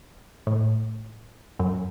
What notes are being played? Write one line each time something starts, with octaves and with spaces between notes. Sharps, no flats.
A2
F#2